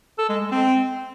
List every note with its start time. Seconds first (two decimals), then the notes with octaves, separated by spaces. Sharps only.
0.18 A4
0.29 G#3
0.40 G#3
0.51 C4